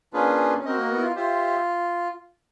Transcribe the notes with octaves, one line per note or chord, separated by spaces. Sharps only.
A#3 C#4 D4 F4 G#4 B4
C#4
C4 F#4 A#4 D#5
A#3
B3
E4
F4
F4 G4 C5 E5